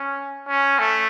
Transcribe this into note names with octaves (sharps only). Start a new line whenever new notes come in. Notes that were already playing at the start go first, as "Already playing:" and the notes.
Already playing: C#4
C#4
A3